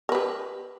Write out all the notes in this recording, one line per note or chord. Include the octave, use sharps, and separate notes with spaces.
G4 A#4 B4